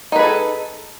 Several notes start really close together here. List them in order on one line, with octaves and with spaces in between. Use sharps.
D#4 B4 G#4 A4